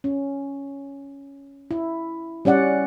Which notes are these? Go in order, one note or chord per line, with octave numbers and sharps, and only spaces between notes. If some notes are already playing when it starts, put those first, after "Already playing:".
C#4
E4
G3 C#4 D5 F#5